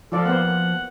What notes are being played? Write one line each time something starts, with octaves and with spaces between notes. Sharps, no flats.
F3 F4 A4 D5
A#3 B3 C5 F#5